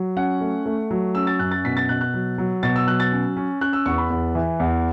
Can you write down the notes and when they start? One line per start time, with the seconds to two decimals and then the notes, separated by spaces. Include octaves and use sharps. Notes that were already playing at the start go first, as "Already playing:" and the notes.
Already playing: F#3
0.17 C#4 F#5
0.41 A3
0.66 A3
0.91 F#3
1.15 C#4 E6
1.27 A6
1.39 F#2 F#6
1.51 A6
1.65 B2 B6
1.77 A6
1.89 B2 F#6
2.01 F#6
2.14 F#3
2.38 F#3
2.63 B2 A6
2.76 E6
2.87 F#3 F#6
3.00 A6
3.12 C#4
3.37 C#4
3.61 C#4 F#6
3.73 E6
3.86 E2 C#6
3.98 B5
4.10 E2
4.35 E3
4.60 E2